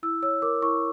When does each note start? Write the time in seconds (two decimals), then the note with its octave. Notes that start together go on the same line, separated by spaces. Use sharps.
0.03 E4 E6
0.23 C#5 E6
0.42 A#4 D6
0.62 E4 C#6